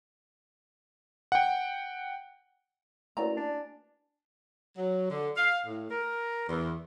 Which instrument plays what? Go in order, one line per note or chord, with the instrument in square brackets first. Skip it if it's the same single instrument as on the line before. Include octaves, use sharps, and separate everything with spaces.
[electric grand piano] F#5 G5
[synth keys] A3 E4 B4 [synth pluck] A#3 C#4 F#4 [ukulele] D5 A#5
[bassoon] D4 [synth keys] G#5
[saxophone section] F#3
D3
F5
A2
A#4
E2